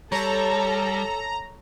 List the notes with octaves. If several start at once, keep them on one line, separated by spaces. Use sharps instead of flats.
G3 A4 C#5 A#5